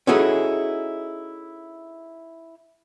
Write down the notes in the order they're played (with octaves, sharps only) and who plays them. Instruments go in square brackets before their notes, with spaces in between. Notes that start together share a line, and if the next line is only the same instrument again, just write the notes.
[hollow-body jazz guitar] C#4 D#4 E4 F#4 G#4 A4